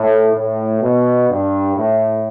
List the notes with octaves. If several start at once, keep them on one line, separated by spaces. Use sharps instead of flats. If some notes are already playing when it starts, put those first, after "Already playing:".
Already playing: A2
A2
B2
G2
A2